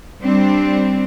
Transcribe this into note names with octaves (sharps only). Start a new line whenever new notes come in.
G3 C4 D4